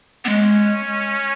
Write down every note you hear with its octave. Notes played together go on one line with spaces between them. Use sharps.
B3
G#3 C#4